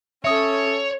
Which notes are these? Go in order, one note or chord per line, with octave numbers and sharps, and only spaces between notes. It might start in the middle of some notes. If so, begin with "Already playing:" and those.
C#4 A4 C#5 E5 D#6